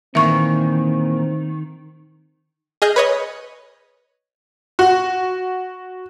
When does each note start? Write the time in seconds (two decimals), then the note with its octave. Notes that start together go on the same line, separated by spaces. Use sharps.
0.15 A#2 D#3 E3 A#3 C4 E5 C#6
2.82 G#4 D#5 F6 G6
2.96 B4 C#5 D#5
4.79 F#4